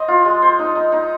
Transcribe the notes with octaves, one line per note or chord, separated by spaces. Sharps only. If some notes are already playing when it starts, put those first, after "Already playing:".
Already playing: C4 D#5
F4
G#3
C5
D#4
D#4
D#4